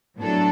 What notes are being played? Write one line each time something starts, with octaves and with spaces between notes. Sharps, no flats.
A2 F#3 B3 D4 A4